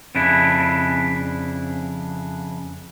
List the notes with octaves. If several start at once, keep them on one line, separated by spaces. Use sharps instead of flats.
F2 C#3 D4 E4